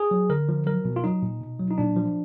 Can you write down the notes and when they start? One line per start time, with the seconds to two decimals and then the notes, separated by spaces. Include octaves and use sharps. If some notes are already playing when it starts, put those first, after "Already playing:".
Already playing: G#4
0.11 F#3
0.29 D3 A#4
0.49 F3
0.66 F#3 A#4
0.85 B2
0.96 F4
1.04 F#3 D#4
1.22 A#2
1.41 B2
1.59 F#3
1.71 D#4
1.78 A#2 D4
1.96 F3